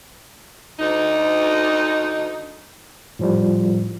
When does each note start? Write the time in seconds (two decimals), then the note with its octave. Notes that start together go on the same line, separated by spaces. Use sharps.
0.79 D2 D#4
3.19 A2 F3 G3